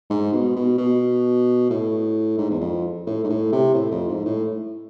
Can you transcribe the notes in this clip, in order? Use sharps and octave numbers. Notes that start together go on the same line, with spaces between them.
G#2
B2
B2
B2
A2
G#2
E2
F2
A2
G#2
A2
C3
A2
F2
G#2
A2